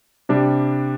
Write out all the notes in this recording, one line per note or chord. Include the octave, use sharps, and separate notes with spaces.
C3 G3 D4